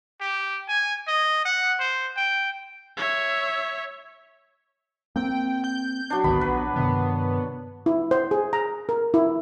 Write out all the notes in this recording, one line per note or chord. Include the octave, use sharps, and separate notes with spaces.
G4
G#5
D#5
F#5
C5
G5
C#5 E5
A#3 C4 G5
G6
F#3 D4
G#1 D2 D#3 B3 B5
A#1 B4
G2 C3 D#3 B3
E4
C5
G#4
A#5
A#4
E4